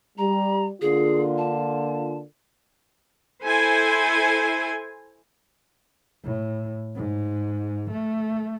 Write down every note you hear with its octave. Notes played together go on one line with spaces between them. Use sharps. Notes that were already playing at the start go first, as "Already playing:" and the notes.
G3 A#5
D3 A#3 F4 G#4
A5
E4 A4 C5 G#5
A2
G#2
A3